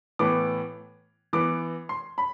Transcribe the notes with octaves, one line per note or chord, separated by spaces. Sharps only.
A2 E3 B3 D6
E3 B3 D6
C6
B5